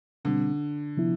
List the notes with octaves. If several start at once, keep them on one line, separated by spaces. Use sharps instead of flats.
B2 D3 G3 C4
C3 F3 B3 E4